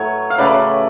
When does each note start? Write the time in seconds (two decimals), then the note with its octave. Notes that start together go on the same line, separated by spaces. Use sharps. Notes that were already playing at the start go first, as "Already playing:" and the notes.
Already playing: A2 F#3 A3 B4 C#5
0.30 F5
0.38 C#3 F#3 A3 B4 D5